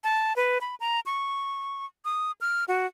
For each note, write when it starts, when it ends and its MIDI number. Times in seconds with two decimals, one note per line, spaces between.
0.04 0.35 81
0.36 0.58 71
0.61 0.75 83
0.80 1.00 82
1.06 1.85 85
2.05 2.32 87
2.41 2.64 89
2.68 2.87 66